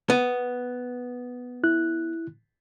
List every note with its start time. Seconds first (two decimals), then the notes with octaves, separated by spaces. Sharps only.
0.10 B3
1.64 E4 F#6